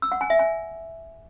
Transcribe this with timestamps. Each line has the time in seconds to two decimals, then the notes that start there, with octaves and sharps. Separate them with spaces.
0.02 E6
0.12 F#5
0.21 G#5
0.30 E5
0.39 G#5